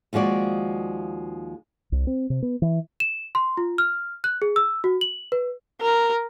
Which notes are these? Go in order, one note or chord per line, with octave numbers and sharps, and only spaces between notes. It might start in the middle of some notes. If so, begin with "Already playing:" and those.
D#2 F3 G#3 F#4 D5
C2
C4
C3
B3
E3
E7
C6
F4
F6
F#6
G#4
E6
F#4
F#7
B4
A#4